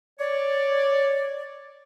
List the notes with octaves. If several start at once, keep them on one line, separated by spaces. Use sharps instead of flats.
C#5 D5